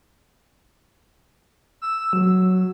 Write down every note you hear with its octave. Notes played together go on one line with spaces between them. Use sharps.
E6
F#3